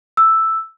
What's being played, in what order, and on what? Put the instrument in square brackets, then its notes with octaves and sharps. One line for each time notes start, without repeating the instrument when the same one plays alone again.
[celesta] E6